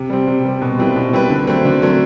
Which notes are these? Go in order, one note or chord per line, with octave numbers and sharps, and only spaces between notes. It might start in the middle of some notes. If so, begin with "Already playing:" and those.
Already playing: C3
G3 C4
C3
G3 C4
B2
G3 C4 E4 B4
B2
G3 C4 E4 B4
D3
F#3 A3 C4
D3
F#3 A3 C4